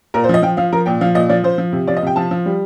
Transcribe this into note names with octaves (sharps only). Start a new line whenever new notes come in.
A#2 A#4
C5
F3
D#5
F3 G5
F3 F5
F3 A#4
A#2 G5
F3 F5
A#2 D#5
F3 D5
F3 C5
F3
C3
F3 D5
D#5
C3 G5
F3 A5
F3
G3